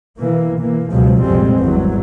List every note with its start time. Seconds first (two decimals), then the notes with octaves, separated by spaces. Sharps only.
0.20 B2 E3 A#3
0.62 E3 A#3
0.93 C#2 B2 F3 F#3 G#3
1.24 F1 A#1 F2 G3 G#3 C4
1.60 G#1 E2 E3 F#3 G3